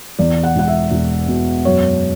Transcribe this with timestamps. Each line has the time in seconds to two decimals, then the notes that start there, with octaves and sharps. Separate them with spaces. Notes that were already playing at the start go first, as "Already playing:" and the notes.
0.19 E2 D5
0.43 F#5
0.56 E1 F#5
0.68 E5
0.91 E1
1.28 B2
1.65 F#2 C#5